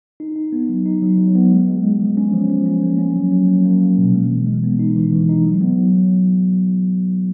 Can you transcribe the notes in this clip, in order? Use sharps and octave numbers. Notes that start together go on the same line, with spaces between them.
D#4
D#4
B3
F#3
D#4
F#3
F#3
B3
G#3
G#3
G#3
F3
C#4
F3
F3
C#4
A#3
C#4
F#3
F#3
A#3
A#3
F#3
B2
G#3
E3
G#3
B3
D#4
E3
E3
D#4
F#3
B3
F#3